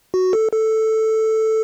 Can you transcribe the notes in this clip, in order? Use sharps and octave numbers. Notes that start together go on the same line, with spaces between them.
F#4
A4
A4